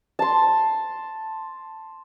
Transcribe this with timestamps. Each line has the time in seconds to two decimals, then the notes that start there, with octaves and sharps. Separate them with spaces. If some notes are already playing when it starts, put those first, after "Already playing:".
0.19 A5 C6